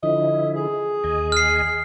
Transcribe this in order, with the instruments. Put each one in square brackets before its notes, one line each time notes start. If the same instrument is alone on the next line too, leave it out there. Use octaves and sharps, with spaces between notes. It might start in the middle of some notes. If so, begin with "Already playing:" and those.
[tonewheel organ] D3 F3 E4 [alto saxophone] D#5
[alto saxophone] G#4
[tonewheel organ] D#2 D#5 G#5
[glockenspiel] F6 C7